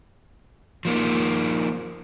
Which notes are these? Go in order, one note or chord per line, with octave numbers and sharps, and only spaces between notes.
F3 A#3 D#4